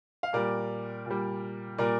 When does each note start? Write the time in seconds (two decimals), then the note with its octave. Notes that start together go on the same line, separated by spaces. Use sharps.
0.23 F5
0.33 A#2 G3 A#4 D5
1.06 A#2 G3
1.78 A#2 G3 A#4 D5